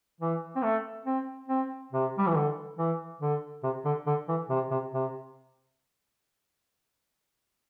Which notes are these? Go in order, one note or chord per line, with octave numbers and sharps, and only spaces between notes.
E3
C4
A3
C4
C4
C3
G3
E3
D3
E3
D3
C3
D3
D3
E3
C3
C3
C3